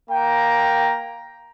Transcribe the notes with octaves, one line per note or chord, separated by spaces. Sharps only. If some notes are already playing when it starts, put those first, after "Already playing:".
A#3 G5 A#5